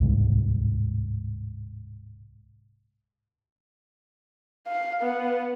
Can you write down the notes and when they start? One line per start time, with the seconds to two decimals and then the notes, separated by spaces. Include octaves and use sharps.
0.01 D1 C2 G#2
4.68 F5
5.02 B3